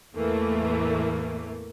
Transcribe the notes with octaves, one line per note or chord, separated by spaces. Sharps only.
E2 A2 E3 A3 A#3